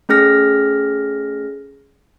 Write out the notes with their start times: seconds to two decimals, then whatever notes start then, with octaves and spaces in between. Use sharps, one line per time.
0.09 A3 C#4 G#4 F6 A#6